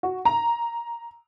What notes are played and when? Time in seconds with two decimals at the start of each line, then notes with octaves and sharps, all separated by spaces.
0.03 F#4
0.25 A#5